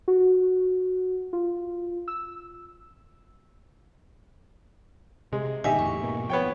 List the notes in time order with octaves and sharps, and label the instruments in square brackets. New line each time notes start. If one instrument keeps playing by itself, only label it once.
[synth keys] F#4
F4
E6
[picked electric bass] C3 [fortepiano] G#3
[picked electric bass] G2 A#2 D3 [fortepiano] D#4 G4 E5 [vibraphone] G#5
[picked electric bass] E2 A2 [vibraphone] C#6
[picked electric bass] G#2 B2 A#3
[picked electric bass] F3 [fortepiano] B3 C#5 G5